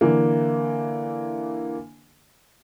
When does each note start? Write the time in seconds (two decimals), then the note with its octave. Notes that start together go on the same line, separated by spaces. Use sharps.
0.01 D3 E3 A#3